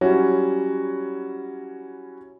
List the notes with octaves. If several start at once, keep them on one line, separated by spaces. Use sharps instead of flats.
F#3 G3 C#4 E4 F#4